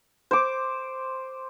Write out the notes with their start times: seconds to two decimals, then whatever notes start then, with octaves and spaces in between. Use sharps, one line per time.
0.31 C5 D6